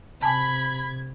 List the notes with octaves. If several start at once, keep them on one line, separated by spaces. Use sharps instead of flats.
C3 G#5 A5 B5 G#6